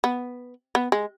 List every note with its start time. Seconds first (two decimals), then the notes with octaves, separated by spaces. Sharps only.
0.04 B3
0.75 B3
0.92 G#3